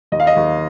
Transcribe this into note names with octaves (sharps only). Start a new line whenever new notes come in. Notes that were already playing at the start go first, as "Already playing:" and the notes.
D#2 D#5
F5
D#5
D#2